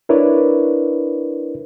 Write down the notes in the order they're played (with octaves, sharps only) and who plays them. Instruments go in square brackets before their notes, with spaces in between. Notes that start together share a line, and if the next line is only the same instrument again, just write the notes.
[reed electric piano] D4 E4 A#4 B4 C#5 D5